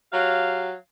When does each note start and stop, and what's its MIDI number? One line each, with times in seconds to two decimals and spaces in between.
0.13 0.73 54
0.13 0.73 67
0.13 0.73 77